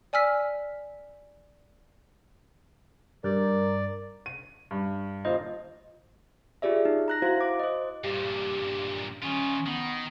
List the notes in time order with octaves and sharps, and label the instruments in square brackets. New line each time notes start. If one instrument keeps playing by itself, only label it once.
[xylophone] D5 G#5 E6 F6 B6
[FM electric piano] G2 [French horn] A#4 [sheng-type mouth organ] D5
[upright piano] D#7
G2
[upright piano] D#1 F4 C5 [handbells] D#5
[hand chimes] F4 G4 G#4 D5 E5
D#4
A#5 F#6 A#6
E4 F#4 C5 F5
D6
C5 D#5
[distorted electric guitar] G2 A#2 [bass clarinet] G4
[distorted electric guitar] D#3 F4 [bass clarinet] C#4
[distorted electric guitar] D#3 [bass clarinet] B3